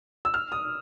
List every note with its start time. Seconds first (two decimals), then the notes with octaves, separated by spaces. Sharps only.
0.25 E6
0.34 F6
0.52 D#6